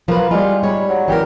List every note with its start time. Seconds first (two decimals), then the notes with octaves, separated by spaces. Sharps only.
0.08 F3 F#3 A#3 B4
0.31 G3 G#3 E4 F4
0.63 G#2 G3 C#5 B5
0.89 F#3
1.08 F#2 E3 G4 A#4 G5